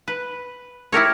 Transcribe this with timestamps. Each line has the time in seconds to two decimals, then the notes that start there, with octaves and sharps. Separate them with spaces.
0.08 B4
0.92 E4 G4 A#4 C#5